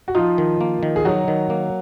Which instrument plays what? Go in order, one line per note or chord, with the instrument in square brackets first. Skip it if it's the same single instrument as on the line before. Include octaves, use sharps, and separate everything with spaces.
[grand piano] F#4
[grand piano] F3 F4 [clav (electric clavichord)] D#4
[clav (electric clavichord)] D#3
A#3
D#3
[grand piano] G#4
[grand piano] F#3 F#4 [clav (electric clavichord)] D#4
[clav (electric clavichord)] D#3
A#3